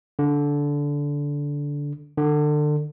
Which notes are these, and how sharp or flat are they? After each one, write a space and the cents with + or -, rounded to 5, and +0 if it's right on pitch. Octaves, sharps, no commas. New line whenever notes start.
D3 -15
D3 +30